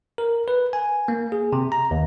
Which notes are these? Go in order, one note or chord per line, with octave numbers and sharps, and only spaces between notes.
A#4
B4
G#5
A#3
G#4
C3
A#5
D#2